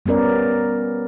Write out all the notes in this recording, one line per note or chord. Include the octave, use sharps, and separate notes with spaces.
G3 B3 C#4 A#4 D5